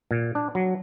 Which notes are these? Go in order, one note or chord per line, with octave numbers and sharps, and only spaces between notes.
A#2
D4
F#3